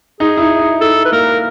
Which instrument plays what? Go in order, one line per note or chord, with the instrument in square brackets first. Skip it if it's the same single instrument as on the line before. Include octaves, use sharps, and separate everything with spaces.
[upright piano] D#4 [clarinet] G#4
[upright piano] E4
D#4
D#4
[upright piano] D#4 [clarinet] A4
[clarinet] B4
[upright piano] A#3 [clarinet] A#4